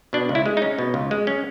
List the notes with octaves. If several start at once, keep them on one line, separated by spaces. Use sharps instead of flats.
B2 D4
C#2
E4
G#3
C#4 D#4
B2
C#2
G#3
C#4